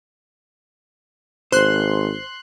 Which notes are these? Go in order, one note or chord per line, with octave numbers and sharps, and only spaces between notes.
G#1 C5 C6 F#6